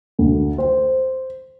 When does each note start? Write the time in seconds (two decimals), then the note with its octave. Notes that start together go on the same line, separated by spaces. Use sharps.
0.19 D2
0.58 C5